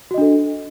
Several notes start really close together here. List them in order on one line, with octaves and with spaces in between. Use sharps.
F#4 D#5 D4 A4